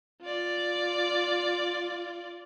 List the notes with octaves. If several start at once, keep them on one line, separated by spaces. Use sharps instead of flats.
F4 D5